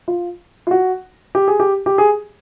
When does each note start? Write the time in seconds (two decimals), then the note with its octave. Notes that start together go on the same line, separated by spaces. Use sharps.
0.08 F4
0.67 F4
0.71 F#4
1.35 G4
1.48 G#4
1.60 G4
1.86 G4
1.98 G#4